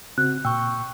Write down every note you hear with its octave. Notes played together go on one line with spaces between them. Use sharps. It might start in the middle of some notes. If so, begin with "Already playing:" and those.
C#3 C4 F#4 F#6
A#2 G5 C#6 E6